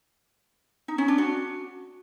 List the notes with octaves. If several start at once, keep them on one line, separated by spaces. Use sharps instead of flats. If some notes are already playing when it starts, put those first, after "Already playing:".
D#4
C#4
D4
F#4